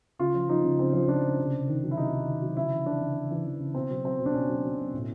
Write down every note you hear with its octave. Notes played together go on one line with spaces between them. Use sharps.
C#3 F4
F3
F3 D#4
C#3
C#3 C4
F3
F3 D4
C#3
C3
C3
D#3
F#3
E4
C3 D#4
C3
D#3
F#3
C#3 E4
E3
E3 D4
C#3
C#3
E3
E3
C#3
B2 C4
F#3
F#3 C4
B2
D4
B2 C#4
F#3
F#3
B2
A2